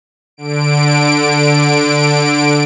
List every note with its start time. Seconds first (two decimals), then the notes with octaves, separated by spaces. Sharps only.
0.37 D3 D7